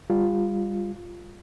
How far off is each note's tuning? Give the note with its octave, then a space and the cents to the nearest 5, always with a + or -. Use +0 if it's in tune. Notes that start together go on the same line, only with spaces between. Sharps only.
G3 +25 F4 +0